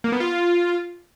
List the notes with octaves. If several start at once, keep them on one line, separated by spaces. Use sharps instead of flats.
A#3
B3
F4